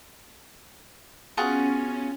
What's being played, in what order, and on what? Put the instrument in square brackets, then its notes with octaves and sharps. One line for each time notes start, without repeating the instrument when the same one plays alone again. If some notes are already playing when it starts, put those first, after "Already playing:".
[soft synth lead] B3 [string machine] C#4 [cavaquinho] F4 F#4 G#4